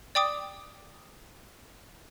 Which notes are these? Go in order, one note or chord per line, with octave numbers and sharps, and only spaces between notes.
D5 G5 D6 D#6